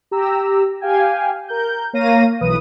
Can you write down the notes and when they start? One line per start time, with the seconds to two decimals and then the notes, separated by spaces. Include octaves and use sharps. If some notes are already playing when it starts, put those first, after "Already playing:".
0.11 G4 A#5 E6
0.81 G4 F5 G5 G#5
1.48 A#4 G6
1.93 A#3 C#5 F5 A#5 A#6 D#7
2.41 B1 E3 B4 D#6 D#7